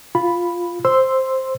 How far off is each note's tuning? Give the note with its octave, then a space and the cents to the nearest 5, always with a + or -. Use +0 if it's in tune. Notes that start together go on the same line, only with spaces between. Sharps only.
F4 +0 B5 +0
C5 +5 C6 -5 E6 +0